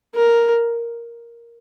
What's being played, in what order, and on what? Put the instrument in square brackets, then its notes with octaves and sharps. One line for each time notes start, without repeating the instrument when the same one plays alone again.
[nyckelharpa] A#4